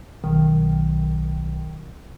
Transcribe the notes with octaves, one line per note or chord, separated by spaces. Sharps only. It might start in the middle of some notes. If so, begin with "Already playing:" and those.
B1 D#3